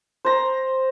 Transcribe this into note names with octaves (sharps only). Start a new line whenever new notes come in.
C5 A#5